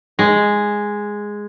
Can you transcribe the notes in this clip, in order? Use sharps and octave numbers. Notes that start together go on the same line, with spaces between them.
G#3